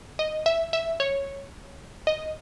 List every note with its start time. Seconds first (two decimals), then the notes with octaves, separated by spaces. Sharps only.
0.19 D#5
0.46 E5
0.73 E5
1.00 C#5
2.07 D#5